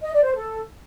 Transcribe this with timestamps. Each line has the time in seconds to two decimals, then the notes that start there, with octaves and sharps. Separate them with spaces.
0.02 D#5
0.13 D5
0.24 C5
0.35 A4